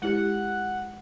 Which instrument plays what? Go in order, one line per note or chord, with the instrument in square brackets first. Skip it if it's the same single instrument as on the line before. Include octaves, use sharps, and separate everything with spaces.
[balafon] G#3 E4 G4 [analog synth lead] F#5